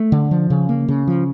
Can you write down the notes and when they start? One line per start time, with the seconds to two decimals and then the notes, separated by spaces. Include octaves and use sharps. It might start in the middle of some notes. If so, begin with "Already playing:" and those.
Already playing: A3
0.12 D3
0.31 F3
0.50 C#3
0.69 A#3
0.88 C#3
1.08 F3